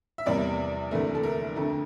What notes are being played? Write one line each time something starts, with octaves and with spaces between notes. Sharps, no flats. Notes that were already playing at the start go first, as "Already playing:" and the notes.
E5
E2 C3 G3 A#4 D5
D2 C3 E3 A3 A#4
A4
A#4
F2 D3 A3